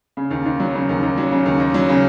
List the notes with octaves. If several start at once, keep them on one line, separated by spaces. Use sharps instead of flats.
C#3
D#2
D#2
F#3
C#3
D#2
D#2
F#3
C#3
D#2
D#2
F#3
C#3